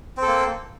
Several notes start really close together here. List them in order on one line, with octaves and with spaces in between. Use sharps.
C4 A4 A#3